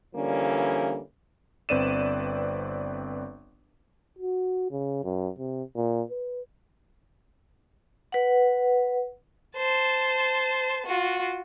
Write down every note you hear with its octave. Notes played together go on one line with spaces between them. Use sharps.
D3 E3 F3 G3 A#3 C#4
G1 C4 B4 D5 D#7 E7
F#4
C#3
F#2
C3
A#2
B4
B4 F#5
C5 A5
F4 F#4